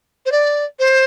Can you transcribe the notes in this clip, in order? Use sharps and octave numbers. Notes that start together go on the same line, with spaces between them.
C5
D5
C5